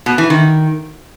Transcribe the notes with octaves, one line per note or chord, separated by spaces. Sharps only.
B2
E3
D#3